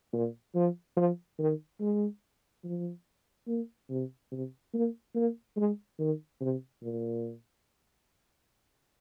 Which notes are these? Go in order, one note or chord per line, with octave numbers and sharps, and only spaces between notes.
A#2
F3
F3
D#3
G#3
F3
A#3
C3
C3
A#3
A#3
G#3
D#3
C3
A#2